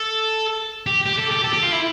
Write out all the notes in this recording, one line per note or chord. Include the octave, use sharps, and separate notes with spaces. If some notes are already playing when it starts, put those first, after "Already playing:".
Already playing: A4
G4
G4
A4
G4
A4
G4
F4
E4